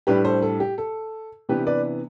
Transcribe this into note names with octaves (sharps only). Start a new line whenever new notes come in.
A2 G3 D4 G4 B4
A4 C5
A4
G4
A4
C3 E3 B3 D4 G4 B4
B4 D5